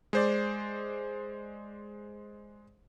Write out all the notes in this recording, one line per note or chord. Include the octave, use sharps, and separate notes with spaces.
G#3 C5 D5